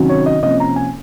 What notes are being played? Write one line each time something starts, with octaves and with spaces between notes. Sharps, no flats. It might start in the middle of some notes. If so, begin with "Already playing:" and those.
Already playing: C3 D#3 F#3 C#4
C#5
D#5
C3 F3 A#3 C#4 D#5
A#5
G#5